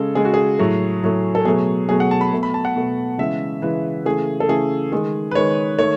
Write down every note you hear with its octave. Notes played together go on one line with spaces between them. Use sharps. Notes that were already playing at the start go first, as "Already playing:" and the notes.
Already playing: C#3 G#3 A4
C#3 G#3 G#4
F#4
G#4
A2 F#3 A3
A2 F#3 A3
A4
B2 F#3 A3 G#4
B2 F#3 A3 G#4
F#5
A5
B5
B2 A3
B5
A5
F#5
B2 A3
C#3 E3 G#3 E5
C#3 E3 G#3 B4
C#3 E3 A3 G#4
A4
C#3 E3 A3 G#4
D#3 G#3 G#4
B4
D#3 G#3 C#5
D#3 A3 C#5